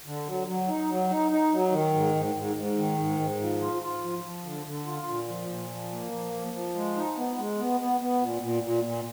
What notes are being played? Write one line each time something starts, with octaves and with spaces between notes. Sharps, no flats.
D3
F#3
F#3
D#4
F#3
D#4
D#4
F#3
D#3
G#2
G#2
G#2
G#2
D#3
G#2
G#2
F3
F4
F4
F3
F3
D3
D3
F4
A#2
F3
A#2
F3
A#3
F3
F3
F3
G#3
D#4
B3
G#3
B3
B3
B3
A#2
A#2
A#2
A#2